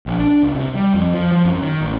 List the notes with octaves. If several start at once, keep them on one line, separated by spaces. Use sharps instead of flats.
A#1
D4
C#2
C3
G3
F2
F3
F3
F#2
D#3
A1